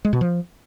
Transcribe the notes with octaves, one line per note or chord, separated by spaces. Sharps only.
G#3
B2
F3